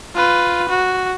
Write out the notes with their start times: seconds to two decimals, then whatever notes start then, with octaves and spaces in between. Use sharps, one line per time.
0.15 F4 B4
0.69 F#4